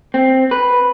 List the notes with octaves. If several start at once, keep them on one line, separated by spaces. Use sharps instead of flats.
C4
B4